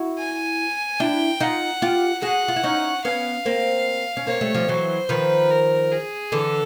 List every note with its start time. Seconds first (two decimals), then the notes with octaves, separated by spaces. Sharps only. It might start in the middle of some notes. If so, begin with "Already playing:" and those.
Already playing: E4 F#4
0.18 G#5
1.00 D4 E4 G5
1.40 D#4 F4 F#5
1.82 F4 G4
2.22 F#4 G#4 F#5
2.48 F4
2.56 E4
2.63 C#4 D#4
3.05 B3 C#4 F5
3.46 A#3 C4
4.17 C#4
4.27 A#3 C4 C#5
4.41 G3 A3
4.54 F3 G3
4.68 E3 F#3 C5
5.09 D#3 F3 B4
5.50 A#4
5.92 G#4
6.32 D3 E3 A4